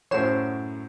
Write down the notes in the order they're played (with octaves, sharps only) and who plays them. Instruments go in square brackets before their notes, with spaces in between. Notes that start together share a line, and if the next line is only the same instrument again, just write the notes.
[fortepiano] F#2 A2 F#3 [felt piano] C5 [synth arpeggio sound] C#5 C7 E7